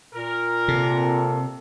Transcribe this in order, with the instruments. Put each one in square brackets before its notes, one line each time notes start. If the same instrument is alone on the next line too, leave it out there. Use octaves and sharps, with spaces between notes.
[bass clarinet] A#2 [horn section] A#4
[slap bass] C3 [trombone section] A#3 C4 A4